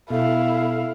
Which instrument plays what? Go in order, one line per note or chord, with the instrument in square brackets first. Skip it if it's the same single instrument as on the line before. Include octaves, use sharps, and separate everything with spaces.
[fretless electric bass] B2 [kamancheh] E4 F5 [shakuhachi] A4